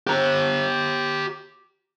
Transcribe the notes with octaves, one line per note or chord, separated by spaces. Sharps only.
G4 A#5